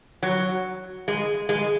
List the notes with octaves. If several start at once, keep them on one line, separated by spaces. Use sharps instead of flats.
F#3
G#3
G#3